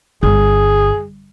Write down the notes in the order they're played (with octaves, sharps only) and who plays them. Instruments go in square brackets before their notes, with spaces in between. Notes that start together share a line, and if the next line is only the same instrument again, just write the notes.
[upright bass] G1 [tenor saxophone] G#4